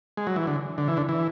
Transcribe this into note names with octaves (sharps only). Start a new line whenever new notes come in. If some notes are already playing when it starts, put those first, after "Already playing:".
G#3
F#3
E3
D3
D3
E3
D3
E3